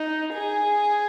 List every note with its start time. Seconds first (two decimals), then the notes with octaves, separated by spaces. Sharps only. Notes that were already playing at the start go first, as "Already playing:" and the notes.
Already playing: D#4
0.33 G#4